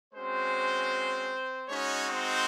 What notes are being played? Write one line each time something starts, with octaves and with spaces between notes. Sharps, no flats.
G#3 C4 C#4 F#4 C5
G#3 C#4 D#4 F#4 C#5
C4 C5